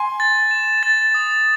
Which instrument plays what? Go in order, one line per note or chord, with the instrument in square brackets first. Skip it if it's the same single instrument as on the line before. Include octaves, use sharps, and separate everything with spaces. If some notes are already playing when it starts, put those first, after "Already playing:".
Already playing: [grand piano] G#5 C6
[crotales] A6
E7
A6
D#6